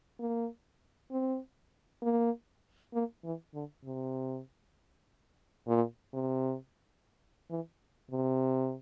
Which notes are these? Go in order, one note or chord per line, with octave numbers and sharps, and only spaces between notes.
A#3
C4
A#3
A#3
E3
D3
C3
A#2
C3
E3
C3